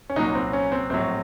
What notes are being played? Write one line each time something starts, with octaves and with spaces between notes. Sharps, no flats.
C#4
C2 A#2 F#3 D#4
C4
C#4
C4
A#1 A2 F#3 C4